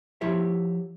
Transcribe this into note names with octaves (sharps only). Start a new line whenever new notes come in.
F3 E4 G4 C#5 E5